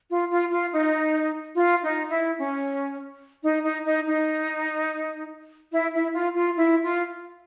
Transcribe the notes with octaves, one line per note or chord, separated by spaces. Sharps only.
F4
F4
F4
D#4
F4
D#4
E4
C#4
D#4
D#4
D#4
D#4
E4
E4
F4
F4
E4
F4